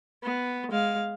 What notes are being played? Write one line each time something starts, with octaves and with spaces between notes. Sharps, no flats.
B3
G#3 F5